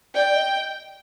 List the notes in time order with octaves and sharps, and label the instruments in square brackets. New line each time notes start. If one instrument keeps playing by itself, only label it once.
[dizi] D5 [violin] G5
[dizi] D#5